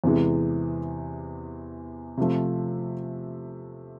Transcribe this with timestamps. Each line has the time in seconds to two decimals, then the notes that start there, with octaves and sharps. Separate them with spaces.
0.04 E2 C3 E3 G#3
2.17 C3 F3 A3